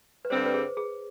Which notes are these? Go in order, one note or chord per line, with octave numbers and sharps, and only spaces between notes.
B4
G2 D3 G3 C4 C5
B4
G#4
G#4